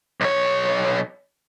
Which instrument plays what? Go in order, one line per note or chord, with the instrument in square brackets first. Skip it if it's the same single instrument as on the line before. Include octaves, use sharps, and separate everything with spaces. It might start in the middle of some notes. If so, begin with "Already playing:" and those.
[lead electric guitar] B1 C#5